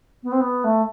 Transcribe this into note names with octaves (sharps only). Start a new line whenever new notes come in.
B3
C4
B3
A3